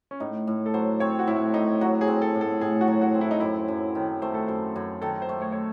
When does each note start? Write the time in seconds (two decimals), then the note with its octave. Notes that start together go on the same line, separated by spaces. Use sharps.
0.11 C#4
0.20 A2 D#4
0.47 A2
0.66 A4
0.74 F#3 C5
1.00 C4 C#5
1.19 F#4
1.27 A2 E4
1.54 A2 D#4
1.81 F#3 F#4
2.01 G#4
2.08 C4
2.22 A4
2.35 A2
2.41 A4
2.61 A2 G#4
2.81 F#4
2.88 F#3
3.01 F#4
3.15 C4
3.21 E4
3.31 D#4
3.40 F#2 E4
3.68 F#2
3.95 D#3
4.22 A3 C5
4.34 A4
4.48 F#2 C5
4.76 F#2
5.02 D#3 A4
5.22 C5
5.29 A3
5.42 C#5
5.52 C#5